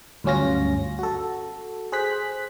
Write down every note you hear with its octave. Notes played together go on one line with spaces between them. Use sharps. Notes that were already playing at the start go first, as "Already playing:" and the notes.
D2 G2 F#3 C#4 F4 A#6
F#4 A4
G#4 C5 F#6 B6